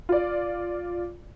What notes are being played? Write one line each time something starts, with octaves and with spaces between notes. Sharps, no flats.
F4 D5